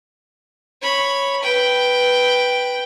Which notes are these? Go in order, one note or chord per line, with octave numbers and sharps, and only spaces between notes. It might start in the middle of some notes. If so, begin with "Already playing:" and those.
C#5 B5
B4 G5